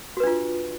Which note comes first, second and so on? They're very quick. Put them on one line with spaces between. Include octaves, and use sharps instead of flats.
F#4 B4 D4 F4